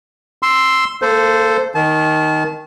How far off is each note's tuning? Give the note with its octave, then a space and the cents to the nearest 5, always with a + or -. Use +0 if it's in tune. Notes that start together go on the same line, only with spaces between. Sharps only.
C6 +0 E6 +0
A#3 -30 A4 +0 C5 -15
D#3 +5 A5 -35